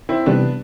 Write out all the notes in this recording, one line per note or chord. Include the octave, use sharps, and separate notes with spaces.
C4 E4
C3 E3 G3 B3 D4